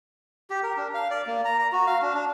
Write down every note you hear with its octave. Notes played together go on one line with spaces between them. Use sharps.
G4
A#4
D4
F5
D5
A#3
A#5
A#5
F#4
F5
D4
D4